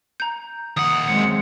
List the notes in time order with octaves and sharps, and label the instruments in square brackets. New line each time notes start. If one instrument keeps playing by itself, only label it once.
[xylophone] A#5 G6
[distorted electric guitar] D#2 F#5 [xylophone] D#6
[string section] F#3 G#3 C4 [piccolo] C#7